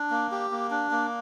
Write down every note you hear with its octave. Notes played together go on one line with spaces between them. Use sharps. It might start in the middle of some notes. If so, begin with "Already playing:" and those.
Already playing: D4
A#3
G4
A#3
D4
A#3